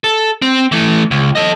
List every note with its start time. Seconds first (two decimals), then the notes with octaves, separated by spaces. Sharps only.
0.04 A4
0.42 C4
0.72 E3 A3
1.11 C#2
1.35 A4 D#5